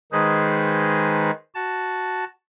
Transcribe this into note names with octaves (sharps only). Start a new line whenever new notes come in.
D#3 G#3 D#4 G#4 B4 C5
F#4 A5